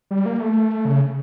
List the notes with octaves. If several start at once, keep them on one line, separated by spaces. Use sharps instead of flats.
G3
A#3
A3
C#3